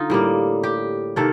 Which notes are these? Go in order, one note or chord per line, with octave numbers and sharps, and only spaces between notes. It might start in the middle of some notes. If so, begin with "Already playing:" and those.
Already playing: D3 D#4 F4
A2 G3 A#3
G4
C3 D#3 A#3 A4